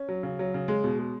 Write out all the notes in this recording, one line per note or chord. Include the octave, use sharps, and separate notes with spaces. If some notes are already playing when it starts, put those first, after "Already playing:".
Already playing: C#4
F#3
C#3
F#3
C#3
G#3
B2
G#3